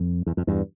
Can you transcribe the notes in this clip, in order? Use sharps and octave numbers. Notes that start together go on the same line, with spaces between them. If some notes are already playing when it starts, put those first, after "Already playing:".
Already playing: F2
E2
F2
E2 G2